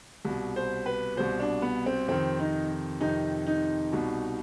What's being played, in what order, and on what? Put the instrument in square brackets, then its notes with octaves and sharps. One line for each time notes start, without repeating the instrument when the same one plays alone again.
[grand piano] C2 B2
C5
B4
C2 B2 C5
D4
B3
C4
F2 C3 D#3 C4
D#4
F2 C3 D#3 D#4
D#4
C2 B2